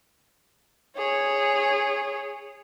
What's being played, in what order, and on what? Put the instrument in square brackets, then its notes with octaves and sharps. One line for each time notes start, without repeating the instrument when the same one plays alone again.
[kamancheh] G#4 C#5